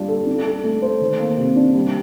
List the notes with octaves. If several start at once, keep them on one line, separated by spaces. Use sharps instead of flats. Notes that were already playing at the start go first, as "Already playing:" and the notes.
Already playing: G3 D4 F4
A4
D4
A4
A3
C5
D#3
A#3
C3
D4
G3